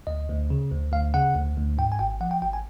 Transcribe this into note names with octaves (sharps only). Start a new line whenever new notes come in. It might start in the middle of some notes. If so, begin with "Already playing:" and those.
D2 D#5
D2
C#3
D2
D2 F5
C#3 F#5
D2
D2
G#2 G5
G#5
G#1 G5
F3 F#5
G5
G#1 G5
G#5